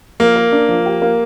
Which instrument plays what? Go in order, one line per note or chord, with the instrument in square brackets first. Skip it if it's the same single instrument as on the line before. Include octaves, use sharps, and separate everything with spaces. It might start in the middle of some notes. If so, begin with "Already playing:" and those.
[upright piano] F3 [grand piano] A#3
[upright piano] A#4
D4
F3
G4
A#3